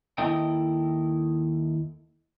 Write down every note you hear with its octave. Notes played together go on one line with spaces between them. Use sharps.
D#2 E4 A4 D#5 G5